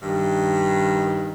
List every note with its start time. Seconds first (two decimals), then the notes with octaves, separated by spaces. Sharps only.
0.02 G2 D#3